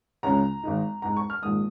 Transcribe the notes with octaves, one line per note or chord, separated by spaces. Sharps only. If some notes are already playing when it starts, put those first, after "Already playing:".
C#2 C#3 G#3 C#4 A#5
G#1 G#2 G#3 D#4
G#2 G#3 D#4 A#5
C#6
F6
A#1 G#2 D#3 G#3 D#6